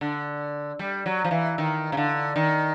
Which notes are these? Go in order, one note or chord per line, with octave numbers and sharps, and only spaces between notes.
D3
G3
F#3
F3
E3
D#3
C#3
D3
D#3